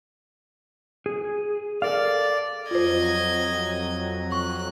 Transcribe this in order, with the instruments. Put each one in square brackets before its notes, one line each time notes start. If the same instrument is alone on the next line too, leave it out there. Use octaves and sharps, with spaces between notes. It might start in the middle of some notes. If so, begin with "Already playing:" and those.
[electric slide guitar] G#4
[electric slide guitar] A4 A#4 F5 [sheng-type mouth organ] D5
[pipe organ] F2 F#3 [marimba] F4 C5 [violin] D#5 G#6
[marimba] C#6 [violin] F#6